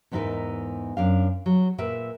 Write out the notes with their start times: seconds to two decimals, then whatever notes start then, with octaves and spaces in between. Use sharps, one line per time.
0.11 E2 G#2 E3 D#4 A#4 E5
0.97 F#2 D4 F5
1.46 F#3
1.78 A#2 A#4 B4 E5